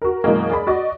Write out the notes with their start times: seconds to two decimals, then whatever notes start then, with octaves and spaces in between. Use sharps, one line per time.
0.02 F#4 A#4
0.24 F#2 B2 E3 G#3 A#3
0.50 G#4 D5 B5
0.67 F#4 D5 D#5